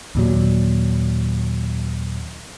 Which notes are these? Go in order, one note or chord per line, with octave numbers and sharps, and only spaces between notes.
D#2 A#2 F#3